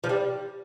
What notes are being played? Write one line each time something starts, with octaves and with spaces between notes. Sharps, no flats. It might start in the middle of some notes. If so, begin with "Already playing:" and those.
F3
G3